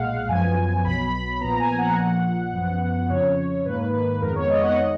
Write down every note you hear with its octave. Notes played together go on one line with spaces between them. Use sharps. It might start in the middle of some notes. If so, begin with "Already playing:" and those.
Already playing: B1 A#2 G#3 F5 F#5
F#2 F3 B3 G#5
B1 B2 F#3 B5
A#1 A#2 F3 B3 A#5
G#5
F#5
A#1 A#2 F3
F#2 F3 B3
F2 C#3 F3 C#5
G#2 D#3 A#3 B4
B4
F2 D#3 G#3 B3 A#4
C#5
D#5
F#5
D#3 G#3 D#5